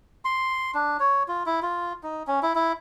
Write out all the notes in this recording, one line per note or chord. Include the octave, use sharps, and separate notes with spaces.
C6
D4
C#5
F4
E4
F4
D#4
C#4
E4
E4